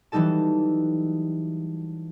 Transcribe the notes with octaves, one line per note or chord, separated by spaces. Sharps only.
E3 F#3 G3 D#4 A4 A5